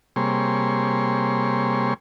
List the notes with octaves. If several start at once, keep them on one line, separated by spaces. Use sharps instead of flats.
C3 G3 A#3 G#4 C#5 C6